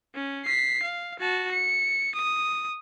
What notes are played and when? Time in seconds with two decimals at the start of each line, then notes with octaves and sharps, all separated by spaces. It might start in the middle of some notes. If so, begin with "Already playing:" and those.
0.15 C#4
0.45 B6 C7
0.83 F5
1.20 F#4 A5
1.52 C#7
2.15 D#6